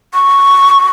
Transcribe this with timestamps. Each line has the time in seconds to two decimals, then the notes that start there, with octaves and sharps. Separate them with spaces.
0.14 C#6